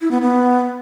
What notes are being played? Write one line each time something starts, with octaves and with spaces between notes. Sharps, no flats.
E4
B3
B3